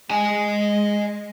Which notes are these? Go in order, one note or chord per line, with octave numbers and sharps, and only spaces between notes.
G#3 D#5 G#5